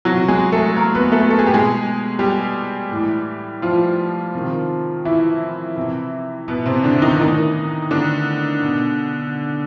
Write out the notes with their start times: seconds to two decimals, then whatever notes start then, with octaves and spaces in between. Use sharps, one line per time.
0.05 C3 E3 F#3 F#4
0.28 G#3 G#4
0.52 A3 A4
0.76 A#3 A#4
0.95 B3 B4
1.12 A3 A4
1.31 A4
1.39 G#4
1.46 B2 G4
1.54 G#3 G#4
2.19 G3 G4
2.91 A2 E3
3.62 F3 F4
4.34 C3 D#3
5.05 E3 E4
5.77 C3 E3
6.48 B2 B3
6.66 C3 C4
6.84 D3 D4
7.02 D#3 D#4
7.19 A2 D#3 E3 D#4
7.91 D3 D4
8.62 B2